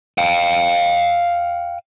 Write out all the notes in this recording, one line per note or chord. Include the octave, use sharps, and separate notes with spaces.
F5 G5